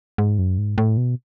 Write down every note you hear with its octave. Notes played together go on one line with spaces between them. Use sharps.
G#2
F#2
G#2
A2
B2